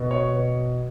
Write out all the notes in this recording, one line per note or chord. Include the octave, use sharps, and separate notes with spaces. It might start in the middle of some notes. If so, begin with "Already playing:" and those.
Already playing: B2
C#5
B2